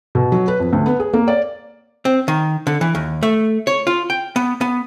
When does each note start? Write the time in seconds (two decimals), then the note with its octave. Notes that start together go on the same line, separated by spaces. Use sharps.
0.15 B2
0.32 F#3
0.48 B4
0.60 F2
0.73 D2
0.86 B3
1.00 G#4
1.14 A#3
1.28 D5
2.05 C4
2.28 D#3
2.67 D3
2.81 E3
2.95 D#2
3.23 A3
3.67 C#5
3.87 F4
4.10 G5
4.36 B3
4.61 B3